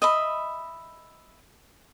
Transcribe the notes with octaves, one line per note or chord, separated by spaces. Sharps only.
D#5 E5 B5